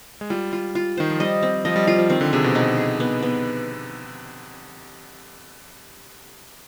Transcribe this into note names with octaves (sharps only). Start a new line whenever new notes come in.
G#3
G3 F4
F4
F4
D#3 C5
F3
G3 D#5
C4
F3 D#5
G3
G3 F4
F3
D#3 C4
D3
C3 G#4
B2
B2 D#4
G#4
B3
B3